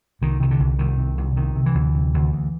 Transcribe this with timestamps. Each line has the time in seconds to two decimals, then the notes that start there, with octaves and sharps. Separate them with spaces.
0.22 C2 D#3
0.40 C3 D#3
0.51 D3
0.60 C2
0.79 C2 D#3
0.98 C3
1.18 C2
1.36 C3 D#3
1.56 C3
1.66 E3
1.75 D2
1.95 C3
2.14 D2
2.33 D2